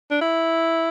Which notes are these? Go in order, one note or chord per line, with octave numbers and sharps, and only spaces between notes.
D4
E4